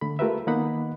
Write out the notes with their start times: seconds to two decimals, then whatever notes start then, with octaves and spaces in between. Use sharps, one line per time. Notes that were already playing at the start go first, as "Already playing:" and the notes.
0.01 D3 A3 B5
0.19 A3 F4 G4 A#4 B4 E5
0.47 D#3 A#3 B3 D#4 F#5 B5